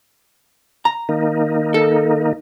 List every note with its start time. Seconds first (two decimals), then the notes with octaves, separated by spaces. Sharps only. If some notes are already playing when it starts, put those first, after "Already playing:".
0.85 A#5
1.09 D#3 A#3 D#4
1.74 A4